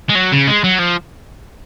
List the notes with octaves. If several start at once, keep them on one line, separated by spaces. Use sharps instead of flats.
G#3
F#3
C#3
G#3
F#3
F3